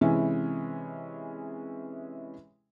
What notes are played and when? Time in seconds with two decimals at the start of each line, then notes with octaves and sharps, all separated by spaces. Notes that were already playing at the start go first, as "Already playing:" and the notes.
0.01 C3 E3 G#3 C#4 E4